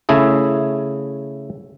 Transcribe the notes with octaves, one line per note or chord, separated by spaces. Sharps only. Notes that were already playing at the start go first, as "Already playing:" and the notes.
C#3 A3 E4 G#4